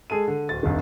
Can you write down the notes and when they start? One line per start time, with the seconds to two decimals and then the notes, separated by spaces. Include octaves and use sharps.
0.10 G#3 G#4 A4 D#7
0.28 D3
0.49 D1 A6
0.63 F1 C2 G2 D#3